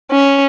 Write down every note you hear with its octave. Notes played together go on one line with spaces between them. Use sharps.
C#4